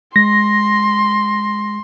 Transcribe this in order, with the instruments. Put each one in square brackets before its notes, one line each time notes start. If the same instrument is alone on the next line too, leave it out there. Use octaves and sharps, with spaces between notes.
[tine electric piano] G#3 [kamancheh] C6 [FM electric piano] A#6